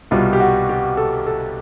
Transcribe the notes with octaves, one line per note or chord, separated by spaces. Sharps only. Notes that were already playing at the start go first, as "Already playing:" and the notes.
C2 B2 G3 F4
G4
F#4
G4
A4
A4